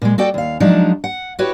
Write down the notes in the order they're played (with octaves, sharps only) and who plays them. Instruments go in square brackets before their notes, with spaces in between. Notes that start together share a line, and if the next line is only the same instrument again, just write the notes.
[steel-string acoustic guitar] A#2 G#3
F#4 A4 D5 G5
D#2 F5
F3 F#3 G#3 D4 D#4
F#5
E4 F#4 G4 B4 C#5